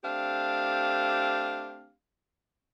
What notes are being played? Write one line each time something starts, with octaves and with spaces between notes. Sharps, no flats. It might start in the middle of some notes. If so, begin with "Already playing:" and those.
A3 C4 D4 G4 F5